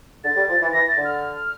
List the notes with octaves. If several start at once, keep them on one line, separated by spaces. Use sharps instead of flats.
D3 A6
G3
F3
E3
E3 A#6
A6
D3
F6